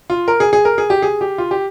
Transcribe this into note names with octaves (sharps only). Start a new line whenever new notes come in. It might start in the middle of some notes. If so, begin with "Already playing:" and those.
F4
A#4
G#4
G#4
A#4
G#4
G4
G#4
G4
F4
G4